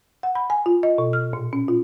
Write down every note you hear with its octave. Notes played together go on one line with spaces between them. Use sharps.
F#5
B5
G#5
F4
D#5
B2
F6
A#2
C#4
F4